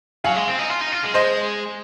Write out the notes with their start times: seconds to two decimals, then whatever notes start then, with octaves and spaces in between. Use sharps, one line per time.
0.24 F#3 F5 G#5
0.36 G#3
0.48 C4
0.59 D#4
0.70 F4
0.81 D#4
0.93 F4
1.04 G#3
1.14 C5 D#5